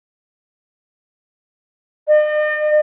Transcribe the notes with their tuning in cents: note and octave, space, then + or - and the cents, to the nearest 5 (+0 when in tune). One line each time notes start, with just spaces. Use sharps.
D#5 -45